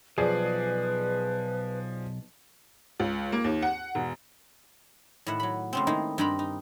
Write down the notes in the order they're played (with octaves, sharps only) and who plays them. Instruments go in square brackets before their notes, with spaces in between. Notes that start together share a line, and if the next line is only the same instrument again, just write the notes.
[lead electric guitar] B1 [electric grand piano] F3 [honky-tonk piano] G#4 D5 [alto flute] B4
[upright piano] C#2
A#3
D#2
F#5
E1
[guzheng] A2 D#3 E4 E5 F#5
F#3 B5
A2 C#3 C4
A2 D#3 G#3 A#3 D#4 E4
G2 C4 D#4 A#4 A#5 B5
D#4